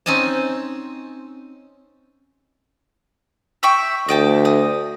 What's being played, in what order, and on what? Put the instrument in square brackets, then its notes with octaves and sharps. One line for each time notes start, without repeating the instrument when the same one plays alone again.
[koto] C4 C#4 D#4 G#5 A5
[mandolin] E5 G5 C#6
[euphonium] D2 [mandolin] D#5 G5 A5
[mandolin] D#5